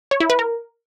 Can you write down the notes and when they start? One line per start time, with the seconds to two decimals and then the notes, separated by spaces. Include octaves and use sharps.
0.11 C#5
0.20 E4
0.30 B4
0.39 A#4